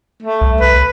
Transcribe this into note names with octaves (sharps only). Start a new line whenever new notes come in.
A3
C2
B4